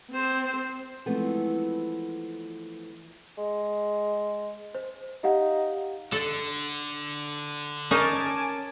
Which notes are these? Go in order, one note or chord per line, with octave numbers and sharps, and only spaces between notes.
C4 C5
E3 F3 G#3 A3 B3 C4
G#3
C5
D#4 G4 F5 F#5
D3 A4
C#4 D#4 A#4 G#5 A5 D6